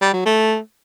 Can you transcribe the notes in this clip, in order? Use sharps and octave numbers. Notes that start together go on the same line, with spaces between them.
G3
F#3
A3